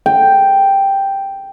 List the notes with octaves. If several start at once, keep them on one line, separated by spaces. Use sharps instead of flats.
G5